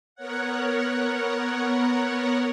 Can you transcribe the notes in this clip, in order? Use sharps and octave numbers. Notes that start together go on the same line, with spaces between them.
B3 A#4 C#5 F#5